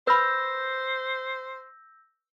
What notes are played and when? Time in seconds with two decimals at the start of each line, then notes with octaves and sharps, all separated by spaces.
0.07 B4 C5 B5 E6 G6 A#6